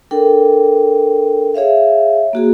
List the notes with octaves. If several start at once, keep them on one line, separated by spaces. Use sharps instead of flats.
D4 A4 A#4 G5
G#4 C#5 E5 F5
A#3 F#4 G#4